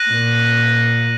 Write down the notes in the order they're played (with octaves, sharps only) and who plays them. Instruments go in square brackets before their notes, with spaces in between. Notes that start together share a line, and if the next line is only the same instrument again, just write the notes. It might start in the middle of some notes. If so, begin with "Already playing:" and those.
Already playing: [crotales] F#6 A#6 D#7 F#7
[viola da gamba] A#2